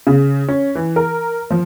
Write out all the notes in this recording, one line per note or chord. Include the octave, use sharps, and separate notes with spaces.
C#3
C#4
E3
A#4
F3